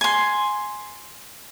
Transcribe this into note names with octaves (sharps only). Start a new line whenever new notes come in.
G#5 C6